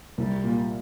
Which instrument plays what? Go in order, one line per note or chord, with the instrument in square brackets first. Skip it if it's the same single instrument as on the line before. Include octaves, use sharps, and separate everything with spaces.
[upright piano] C2 [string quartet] G3
[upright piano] A#2